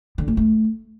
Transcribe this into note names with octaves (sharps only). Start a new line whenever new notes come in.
D3
A#3
A3